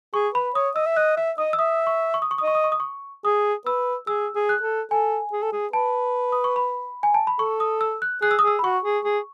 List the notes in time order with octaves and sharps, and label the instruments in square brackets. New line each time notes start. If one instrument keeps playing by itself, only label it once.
[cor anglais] G#4 [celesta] C#6
[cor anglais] B4 [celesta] B5
[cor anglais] C#5 [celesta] D#6
[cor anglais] D#5 [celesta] E6
[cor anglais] E5
[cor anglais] D#5 [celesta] F#6
[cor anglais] E5 [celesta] E6
[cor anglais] D#5 [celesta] D#6
[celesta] E6
[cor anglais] E5 [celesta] D#6
[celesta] C#6
C#6
D#6
C#6
D#6
[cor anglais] D#5
[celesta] C#6
D#6
C#6
D#6
C#6
[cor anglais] G#4 [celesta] D#6
[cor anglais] B4 [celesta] E6
[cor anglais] G#4 [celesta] E6
[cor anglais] G#4
[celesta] F#6
[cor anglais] A4
[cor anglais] A4 [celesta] G#5
[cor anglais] G#4
A4
G#4
[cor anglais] B4 [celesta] A5
[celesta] D#6
C#6
B5
G#5
A5
B5
[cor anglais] A4 [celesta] C#6
[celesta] D#6
E6
F#6
[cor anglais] G#4 [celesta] F#6
[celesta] E6
D#6
[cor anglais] G#4 [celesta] E6
[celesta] B5
[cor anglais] F#4 [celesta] C#6
[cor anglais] G#4
G#4